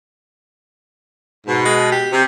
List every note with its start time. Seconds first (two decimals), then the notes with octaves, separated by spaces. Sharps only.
1.46 G#2 B2
1.65 G#3
1.92 G4
2.11 C3